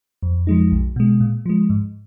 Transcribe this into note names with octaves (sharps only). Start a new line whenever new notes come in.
F2
F3 G#3 D#4
B1
B2 G#3
A#2
F3 G#3
G#2